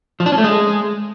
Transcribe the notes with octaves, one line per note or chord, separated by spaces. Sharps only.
F3
D4
C#4
A3
G#3